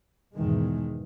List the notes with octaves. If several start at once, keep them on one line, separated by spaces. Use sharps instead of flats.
E2 G#2 B2 D#3 E3 G#3